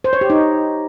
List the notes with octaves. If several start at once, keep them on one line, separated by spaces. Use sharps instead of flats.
C5
C#5
G4
D#4